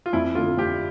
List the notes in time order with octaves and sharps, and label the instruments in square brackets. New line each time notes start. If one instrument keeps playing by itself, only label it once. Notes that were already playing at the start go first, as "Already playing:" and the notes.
[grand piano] F4
[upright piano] F2 [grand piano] E4
[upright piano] D3 A3 C4 [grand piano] F4
[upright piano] F2 [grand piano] G4